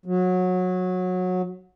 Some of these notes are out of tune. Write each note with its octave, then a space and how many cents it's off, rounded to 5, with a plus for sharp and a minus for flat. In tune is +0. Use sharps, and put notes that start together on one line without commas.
F#3 -20